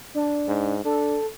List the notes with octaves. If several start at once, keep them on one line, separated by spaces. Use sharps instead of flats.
D4
G#2
D4 A4